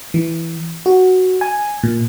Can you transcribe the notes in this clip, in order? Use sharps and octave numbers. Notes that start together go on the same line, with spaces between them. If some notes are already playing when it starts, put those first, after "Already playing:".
E3
F#4
G#5
A#2